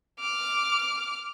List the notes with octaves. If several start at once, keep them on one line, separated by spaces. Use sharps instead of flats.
D6 F6